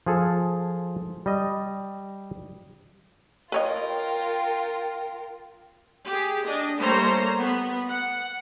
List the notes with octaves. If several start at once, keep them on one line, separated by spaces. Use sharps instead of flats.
F3 G#4 A4
G3 D#5
F4 A#4 B4 C#5 D#5 G5
G4 G#4
D4 D#5
G3 A3 A#3 C5 C#5 A#5
B3
F#5